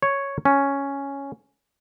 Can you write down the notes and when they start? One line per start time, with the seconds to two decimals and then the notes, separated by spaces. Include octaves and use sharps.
0.02 C#5
0.45 C#4